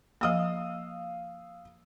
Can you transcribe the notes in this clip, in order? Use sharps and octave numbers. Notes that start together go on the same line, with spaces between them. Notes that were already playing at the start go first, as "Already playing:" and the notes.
F3 A#3 F5 D#6 E6